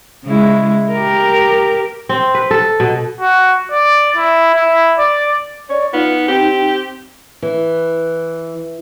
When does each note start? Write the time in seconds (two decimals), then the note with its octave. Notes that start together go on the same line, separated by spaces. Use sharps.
0.25 C#3 G#3 E4
0.92 G4 A#4
2.09 C4
2.35 B4
2.51 A4
2.80 B2
3.20 F#4
3.71 D5
4.16 E4
4.55 E4
4.98 D5
5.69 C#5 D5
5.93 B3 D#4 F4
6.28 C4 G4
7.42 E3